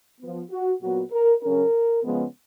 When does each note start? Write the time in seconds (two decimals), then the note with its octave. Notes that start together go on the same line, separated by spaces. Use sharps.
0.21 F3 B3
0.51 F#4
0.82 A#2 F#3 B3 F#4
1.12 A#4
1.43 C#3 F#3 C#4 A#4
2.03 C#3 F3 G#3 B3